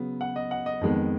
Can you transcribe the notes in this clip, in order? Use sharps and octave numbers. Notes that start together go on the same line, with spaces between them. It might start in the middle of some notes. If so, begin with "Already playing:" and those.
Already playing: C#3 F#3 B3
F#5
D#5
F#5
D#5
F2 D#3 G#3 B3